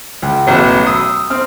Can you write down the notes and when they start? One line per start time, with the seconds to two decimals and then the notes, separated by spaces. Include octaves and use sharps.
0.22 C#2
0.47 A1 B2 F#3
0.87 D#6 E6
1.30 C4 F6